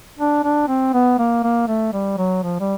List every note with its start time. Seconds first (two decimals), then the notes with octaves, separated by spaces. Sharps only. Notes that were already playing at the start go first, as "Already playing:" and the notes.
0.19 D4
0.44 D4
0.68 C4
0.93 B3
1.18 A#3
1.43 A#3
1.67 A3
1.93 G3
2.17 F#3
2.43 F3
2.60 G3